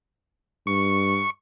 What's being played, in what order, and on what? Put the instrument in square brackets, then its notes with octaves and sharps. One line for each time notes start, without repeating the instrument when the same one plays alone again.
[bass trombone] G2 [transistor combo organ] C#6